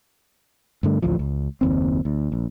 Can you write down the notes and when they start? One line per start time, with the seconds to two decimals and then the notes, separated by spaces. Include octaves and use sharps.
0.83 G2 D3 A3
1.02 A1 D2 A2 F3
1.19 C#2
1.61 F#1 D#2 C4
2.05 D2
2.32 A#1